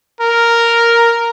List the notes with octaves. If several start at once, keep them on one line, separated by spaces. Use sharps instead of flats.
A#4